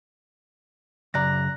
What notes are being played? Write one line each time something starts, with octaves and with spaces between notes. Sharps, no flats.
F#2 C#3 D5 A#5 F#6 A#6